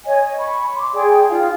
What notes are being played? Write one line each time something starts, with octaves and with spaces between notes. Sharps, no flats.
C#5 D#5 G#5
B5 C#6
C6 D6
G#4 D5 G5
D#4 F4 F5